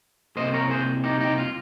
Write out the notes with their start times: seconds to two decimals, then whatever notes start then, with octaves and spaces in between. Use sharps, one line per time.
0.37 C2 C3 F3 A#3 C5 D#5
0.54 A#4 C#5
0.71 G#4 C5
1.04 D#4 G4
1.20 D#4 G4
1.38 F4